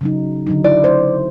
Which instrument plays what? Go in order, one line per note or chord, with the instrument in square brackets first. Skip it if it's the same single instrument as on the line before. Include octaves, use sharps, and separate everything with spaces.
[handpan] C#3 F#3 D#4
D3 F#3 D#4
[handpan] E4 [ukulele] D5
[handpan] C5